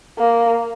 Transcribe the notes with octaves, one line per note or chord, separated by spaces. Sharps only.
A#3